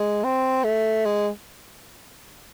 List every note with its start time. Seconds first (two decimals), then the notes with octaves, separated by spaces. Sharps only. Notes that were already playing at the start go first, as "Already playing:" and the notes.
Already playing: G#3
0.24 C4
0.64 A3
1.06 G#3